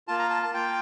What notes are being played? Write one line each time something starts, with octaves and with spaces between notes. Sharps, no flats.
A#3 F4 A5
A#5
A5
A5
A#3 F4 G5